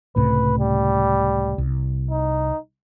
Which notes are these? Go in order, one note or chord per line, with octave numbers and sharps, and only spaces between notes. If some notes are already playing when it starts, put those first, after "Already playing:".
C#2 A2 C3 B4
G3
C2
D#4